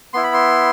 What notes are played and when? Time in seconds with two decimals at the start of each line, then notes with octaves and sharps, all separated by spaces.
0.14 B3 E4 C6
0.23 B5
0.34 C6